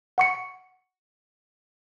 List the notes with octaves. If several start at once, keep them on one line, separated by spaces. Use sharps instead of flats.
F#5 C#6 C#7